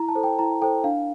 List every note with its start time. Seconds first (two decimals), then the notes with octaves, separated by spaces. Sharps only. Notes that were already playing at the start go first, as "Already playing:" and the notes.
Already playing: E4 A#5
0.09 A5
0.15 A4 C5
0.23 G5
0.39 E4 A#5
0.62 A4 C5 G5
0.84 D4 F5